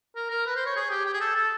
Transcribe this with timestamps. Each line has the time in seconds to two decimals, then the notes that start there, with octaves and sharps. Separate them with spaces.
0.15 A#4
0.30 A#4
0.46 B4
0.56 C5
0.66 C#5
0.76 G#4
0.91 G4
1.06 G4
1.13 G#4
1.21 A4
1.36 A4